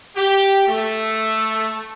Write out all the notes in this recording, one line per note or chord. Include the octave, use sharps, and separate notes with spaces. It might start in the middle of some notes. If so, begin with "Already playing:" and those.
G4
A3